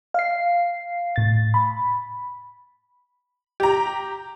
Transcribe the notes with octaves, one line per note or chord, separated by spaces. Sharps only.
F5 C7
A2 A6
B5
G4 A#5